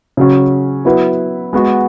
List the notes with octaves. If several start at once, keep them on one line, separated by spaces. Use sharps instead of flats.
C#3 F#3 C#4
F#3 B3 E4 B4
G#3 B3 F#4